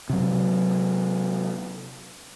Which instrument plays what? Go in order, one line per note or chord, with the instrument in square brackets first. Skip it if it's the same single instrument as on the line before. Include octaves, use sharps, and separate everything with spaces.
[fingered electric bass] C3 F#3